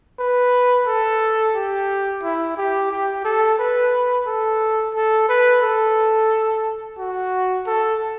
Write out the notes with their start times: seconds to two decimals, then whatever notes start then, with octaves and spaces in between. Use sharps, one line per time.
0.19 B4
0.87 A4
1.55 G4
2.23 E4
2.57 G4
2.91 G4
3.25 A4
3.59 B4
4.26 A4
4.95 A4
5.29 B4
5.63 A4
6.98 F#4
7.67 A4